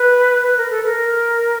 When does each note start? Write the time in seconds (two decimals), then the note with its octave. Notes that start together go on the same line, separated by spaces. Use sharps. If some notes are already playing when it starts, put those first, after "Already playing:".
Already playing: B4
0.43 B4
0.57 A#4
0.70 A4
0.83 B4
0.87 A#4